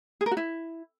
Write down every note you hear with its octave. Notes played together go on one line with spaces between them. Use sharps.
G#4
A#4
F#4
E4